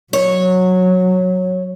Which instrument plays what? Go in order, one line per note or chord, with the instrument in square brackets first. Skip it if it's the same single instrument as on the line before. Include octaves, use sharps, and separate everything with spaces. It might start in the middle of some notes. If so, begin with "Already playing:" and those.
[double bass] F#3 [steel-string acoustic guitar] C#5